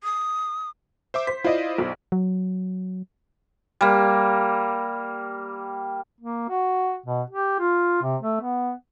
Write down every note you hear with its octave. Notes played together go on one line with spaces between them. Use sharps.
D#6
C5 E5 D6
C5 B6
E4 F4 C5 D5 D#5
B1
F#3
G3 A#3
A#3
F#4
B2
G4
F4
C3
A3
B3